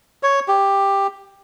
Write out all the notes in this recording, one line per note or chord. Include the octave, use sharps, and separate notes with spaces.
C#5
G4